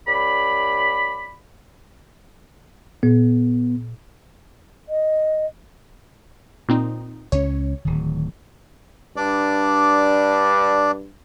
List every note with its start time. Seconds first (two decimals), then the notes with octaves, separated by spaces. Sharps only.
0.07 C#2 D5 B5
3.03 A#2 B3
4.89 D#5
6.69 A#2 C4 D#4
7.32 C#2 C#4 C#5
7.85 D1 D#3
9.17 G2 D4 D5